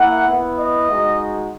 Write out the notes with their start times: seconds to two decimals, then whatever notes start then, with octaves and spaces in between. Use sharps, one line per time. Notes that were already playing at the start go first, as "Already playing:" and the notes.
Already playing: A#3 E4 F#5
0.28 B3 E4
0.58 D#5
0.89 G#3 D#4 F#4